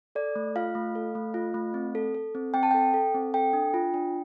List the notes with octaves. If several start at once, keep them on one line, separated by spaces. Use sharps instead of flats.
A4 D5
A3
F4 F5
A3
A4
A3
F4
A3
C4
A4
A4
C4
C4 G5
A5
A4 G5
A4
C4
A4 G5
D4
F4
D4